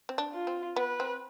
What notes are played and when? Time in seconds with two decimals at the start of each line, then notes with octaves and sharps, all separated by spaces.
0.09 C4
0.18 D4
0.33 F4
0.47 C4
0.76 B3 B4
1.00 C4